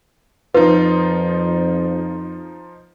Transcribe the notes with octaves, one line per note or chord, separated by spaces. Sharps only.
F2 F3 D#4 F4 B4